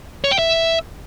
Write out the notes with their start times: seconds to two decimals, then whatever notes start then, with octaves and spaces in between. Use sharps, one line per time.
0.24 C#5
0.31 G5
0.39 E5